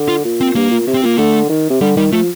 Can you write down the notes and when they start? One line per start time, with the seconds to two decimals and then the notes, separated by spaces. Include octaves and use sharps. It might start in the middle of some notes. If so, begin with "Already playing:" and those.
Already playing: D3
0.08 F4
0.24 A#2
0.41 C4
0.55 G2 A#3
0.71 A#2
0.87 C3
0.94 C4
1.03 A#2 A#3
1.18 D3 A3
1.49 D#3
1.70 C3
1.81 D3 G3
1.97 D#3 G3
2.12 F3 A3